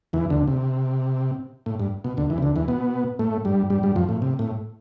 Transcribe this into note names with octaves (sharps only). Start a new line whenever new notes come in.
E2 E3
D2 D3
C3
A2
G2
B2
D2 D3
E2 E3
C3
D2 D3
E2 E3
B2 B3
A2 A3
G2 G3
G2 G3
G2 G3
F2 F3
A2
C3
A2